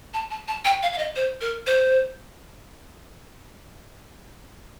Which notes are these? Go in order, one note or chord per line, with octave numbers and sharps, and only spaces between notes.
A5
A5
A5
G5
F5
F5
D#5
C5
A#4
C5